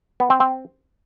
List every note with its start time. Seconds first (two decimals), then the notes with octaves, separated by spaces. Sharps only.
0.20 B3
0.30 C4
0.40 C4